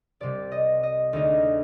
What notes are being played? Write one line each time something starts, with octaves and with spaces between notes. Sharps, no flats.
C2 C3 G3 D5
D#5
D#5
D2 D3 G#3 D#4 D#5